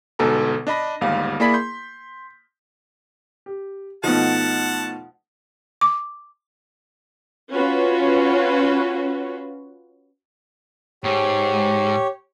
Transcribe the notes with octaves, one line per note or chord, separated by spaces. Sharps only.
G1 G#2 B2 A4 G#5 A#5
D4 D#5 B5 A#6
G1 D#2 G#2 G3 F5
A#3 E4 G#4 D5 B5 B6
C6 G6
G4
B2 F3 A3 D#4 F#5 A5
D6
C#4 F4 F#4 B4
G#2 G#3 G4 C#5